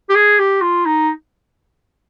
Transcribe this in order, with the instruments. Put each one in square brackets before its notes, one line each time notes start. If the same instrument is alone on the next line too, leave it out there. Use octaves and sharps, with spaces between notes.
[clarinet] G4
G#4
G4
F4
D#4